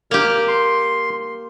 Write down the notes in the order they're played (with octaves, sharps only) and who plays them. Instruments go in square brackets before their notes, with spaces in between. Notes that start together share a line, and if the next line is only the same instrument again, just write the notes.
[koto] A#3 G4 [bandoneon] F6
[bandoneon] C6